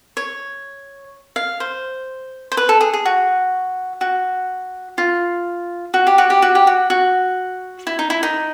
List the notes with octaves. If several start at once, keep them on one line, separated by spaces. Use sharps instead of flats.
C#5
F5
C5
C5
B4
A4
G#4
G#4
F#4
F#4
F4
F#4
G4
F#4
G4
F#4
G4
F#4
F#4
E4
D#4
E4
D#4